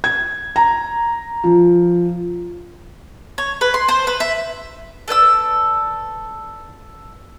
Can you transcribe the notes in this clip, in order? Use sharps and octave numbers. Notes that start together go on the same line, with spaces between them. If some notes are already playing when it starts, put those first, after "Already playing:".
G#6
A#5
F3
C#5
B4
C6
C5
B4
E5
A4 B4 D5 E6